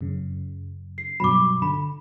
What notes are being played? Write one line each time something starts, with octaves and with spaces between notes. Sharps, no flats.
F#2 C#3
C7
G2 B2 F#3 B5 D6
D3 B5